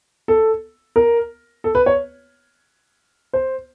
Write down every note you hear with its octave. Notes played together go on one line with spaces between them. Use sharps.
A4
A#4
A4
B4
C#5
C5